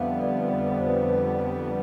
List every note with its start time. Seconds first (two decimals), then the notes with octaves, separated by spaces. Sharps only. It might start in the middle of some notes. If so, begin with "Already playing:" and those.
Already playing: F2 D3 G3 B3 E5 F5
0.22 D5
0.51 D5
0.80 C5
0.87 B4
0.95 C5
1.08 B4